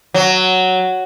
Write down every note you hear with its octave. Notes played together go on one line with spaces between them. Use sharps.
F#3